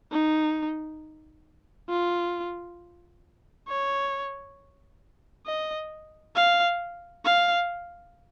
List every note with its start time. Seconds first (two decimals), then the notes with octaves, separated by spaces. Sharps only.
0.11 D#4
1.90 F4
3.68 C#5
5.47 D#5
6.36 F5
7.25 F5